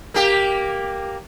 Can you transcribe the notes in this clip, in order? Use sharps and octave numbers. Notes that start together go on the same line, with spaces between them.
A#3 G4